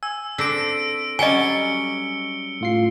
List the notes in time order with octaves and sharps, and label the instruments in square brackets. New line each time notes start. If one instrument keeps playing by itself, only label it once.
[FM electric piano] G#5 [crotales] E6
[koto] C4 D4 A4 [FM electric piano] D6 A#6 B6 [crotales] E6 D7
[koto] F#3 G3 C#4 [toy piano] D#5 G#5 [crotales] C#7 G7
[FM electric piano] A2 F4 C7